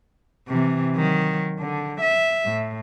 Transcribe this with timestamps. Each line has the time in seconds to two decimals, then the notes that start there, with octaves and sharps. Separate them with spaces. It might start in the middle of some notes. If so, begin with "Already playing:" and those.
0.48 C3 E3
0.96 D#3 F#3
1.60 D3
2.02 E5
2.46 A2